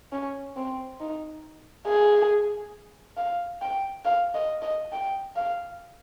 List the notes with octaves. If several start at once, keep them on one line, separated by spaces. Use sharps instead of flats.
C#4
C4
D#4
G#4
F5
G5
F5
D#5
D#5
G5
F5